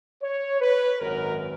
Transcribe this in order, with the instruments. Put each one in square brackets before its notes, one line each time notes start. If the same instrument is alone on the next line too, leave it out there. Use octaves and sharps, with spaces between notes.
[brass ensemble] C#5
B4
G#1 F#2 D#3 F#3 A#4